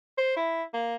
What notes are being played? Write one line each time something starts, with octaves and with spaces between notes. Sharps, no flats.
C5
E4
A#3